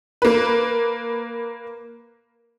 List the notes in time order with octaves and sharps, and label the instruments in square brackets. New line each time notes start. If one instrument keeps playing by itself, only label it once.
[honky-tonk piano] A#3 B4